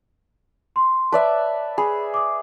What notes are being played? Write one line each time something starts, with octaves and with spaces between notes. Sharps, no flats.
C6
B4 D5 E5 A5
G#4 B5
D6 D#6